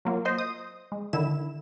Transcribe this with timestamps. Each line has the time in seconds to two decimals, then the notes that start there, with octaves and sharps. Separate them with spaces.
0.05 F#3 A#3 F4
0.25 C5 D#5 C6
0.38 D#6
0.92 G#3
1.13 D3 D#3 E4 E7